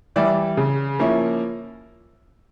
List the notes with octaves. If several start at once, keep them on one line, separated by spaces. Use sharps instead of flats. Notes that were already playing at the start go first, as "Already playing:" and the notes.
E3 G3 D5 E5
C#3
F3 A#3 C#4 E4